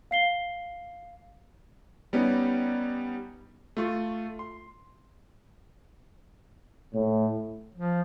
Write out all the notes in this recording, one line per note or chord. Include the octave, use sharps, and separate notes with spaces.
F5 C7 G7
G3 B3 C#4 D#4
A3 F4 C#6
C6
A2
F3